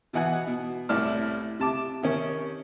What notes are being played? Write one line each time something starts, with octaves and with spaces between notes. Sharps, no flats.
B2 E3 D#4 F#5 G#5
B2
C2 A2 E4 D5 A5 F6
C3 A5 D6
C3 D#3 C#4